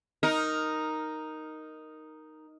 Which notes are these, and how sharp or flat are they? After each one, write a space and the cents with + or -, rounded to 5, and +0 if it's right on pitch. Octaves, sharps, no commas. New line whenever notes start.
D#4 +0 A#4 +0